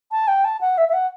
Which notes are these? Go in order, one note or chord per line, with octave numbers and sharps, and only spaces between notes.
A5
G5
A5
F#5
E5
E5
F#5